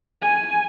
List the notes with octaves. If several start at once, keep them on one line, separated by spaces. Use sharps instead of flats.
G#5